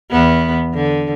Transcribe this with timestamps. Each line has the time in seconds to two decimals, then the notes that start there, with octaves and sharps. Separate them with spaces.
0.11 E2 B3
0.74 D3